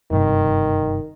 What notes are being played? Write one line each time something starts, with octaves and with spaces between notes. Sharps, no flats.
F#1 G2 C3 D#3